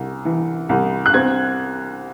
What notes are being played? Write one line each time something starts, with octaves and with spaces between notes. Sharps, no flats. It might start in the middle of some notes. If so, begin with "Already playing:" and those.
Already playing: C2
E3
C2
F#6
C4 G#6